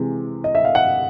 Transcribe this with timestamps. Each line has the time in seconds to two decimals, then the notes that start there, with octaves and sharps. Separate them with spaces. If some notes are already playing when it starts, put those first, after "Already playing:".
Already playing: C3 E3 G#3
0.44 D#5
0.55 E5
0.65 F5
0.75 F#5